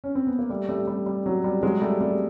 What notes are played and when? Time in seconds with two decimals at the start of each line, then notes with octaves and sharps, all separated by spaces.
0.04 C#4
0.15 C4
0.27 B3
0.39 A#3
0.49 G3 A3
0.69 G3 A3
0.87 G3
1.06 G3
1.26 F#3
1.44 G3
1.63 F#3 G#3
1.82 G3 A3
2.00 G3 A3